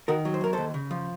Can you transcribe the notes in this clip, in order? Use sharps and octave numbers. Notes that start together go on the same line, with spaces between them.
D#3 F#4 A#4
F#3
C5
F#2 A#4
D#2 A4 C5
C#3
F3